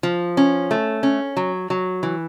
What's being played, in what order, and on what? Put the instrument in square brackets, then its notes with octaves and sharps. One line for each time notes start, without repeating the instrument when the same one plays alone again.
[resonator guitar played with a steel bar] F3
C#4
A3
C#4
F#3
F#3
E3